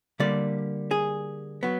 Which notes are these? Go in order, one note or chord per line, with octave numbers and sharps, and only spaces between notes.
D3 G3 A#3 D5
G#4
F#3 B3